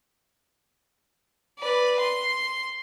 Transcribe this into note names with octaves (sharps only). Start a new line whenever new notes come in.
B4 D5
C6